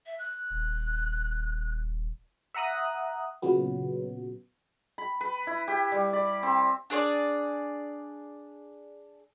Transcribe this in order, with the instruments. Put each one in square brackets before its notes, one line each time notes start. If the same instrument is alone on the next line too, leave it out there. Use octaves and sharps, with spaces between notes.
[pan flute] E5
F#6
[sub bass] D#1
[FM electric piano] E5 F#5 A#5 D#6 F#6
A#2 C#3 F#3 B3
[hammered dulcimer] B5
B4
E4
G4
G3
D5
C4
[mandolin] D4 G#4 C#5 D5